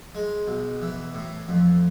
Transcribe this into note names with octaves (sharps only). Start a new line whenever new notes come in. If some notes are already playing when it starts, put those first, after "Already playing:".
G#3
B1
E3
A2
F2